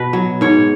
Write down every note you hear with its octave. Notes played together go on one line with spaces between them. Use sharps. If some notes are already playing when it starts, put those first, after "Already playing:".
Already playing: B2 B4
F#3
G#2 C#5